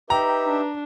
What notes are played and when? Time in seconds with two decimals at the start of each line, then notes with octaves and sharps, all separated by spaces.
0.10 D#4 G4 B4 E5 G5 A#5
0.47 D4